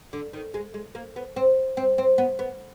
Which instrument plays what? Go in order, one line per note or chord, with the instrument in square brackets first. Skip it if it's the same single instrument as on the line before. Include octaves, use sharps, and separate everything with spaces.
[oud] D3
D#3
G#3
G#3
A#3
B3
C4
C4
C4
B3
B3